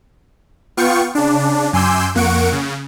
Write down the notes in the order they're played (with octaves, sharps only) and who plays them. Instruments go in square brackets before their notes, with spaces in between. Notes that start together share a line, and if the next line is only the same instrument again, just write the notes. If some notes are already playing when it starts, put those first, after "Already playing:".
[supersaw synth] B3 F4 G5 C#6 C#7
C#3 D4
F#2 G#5 C6 D6 E6 G6
F2 A#3 F#5 C#6 D7
C#3